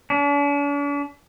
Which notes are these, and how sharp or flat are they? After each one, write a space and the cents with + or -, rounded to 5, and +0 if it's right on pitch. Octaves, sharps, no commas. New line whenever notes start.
D4 -45